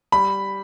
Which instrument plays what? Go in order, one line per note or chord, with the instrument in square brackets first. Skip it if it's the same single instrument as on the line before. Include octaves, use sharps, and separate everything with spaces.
[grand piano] G3 B5